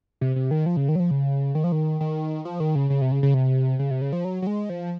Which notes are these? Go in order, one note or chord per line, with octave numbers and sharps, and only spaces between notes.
C3
C3
D#3
F3
C#3
D#3
F#3
F3
C#3
D#3
F3
D#3
D#3
F3
D#3
C#3
C#3
C3
C#3
C#3
C3
C#3
C3
C#3
F3
F#3
F#3
G#3
F3